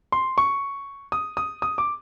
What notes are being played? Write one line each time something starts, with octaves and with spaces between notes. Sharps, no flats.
C6
C#6
D#6
D#6
D#6
D6